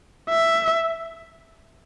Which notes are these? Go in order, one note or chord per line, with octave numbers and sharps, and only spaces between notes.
E5